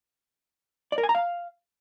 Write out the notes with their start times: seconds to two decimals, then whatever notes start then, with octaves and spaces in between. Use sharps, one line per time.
0.92 D5
0.98 A#4
1.03 G#5
1.09 A#5
1.15 F5